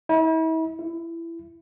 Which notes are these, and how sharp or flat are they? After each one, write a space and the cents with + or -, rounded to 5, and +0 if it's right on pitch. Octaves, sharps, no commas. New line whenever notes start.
E4 -40
E4 +20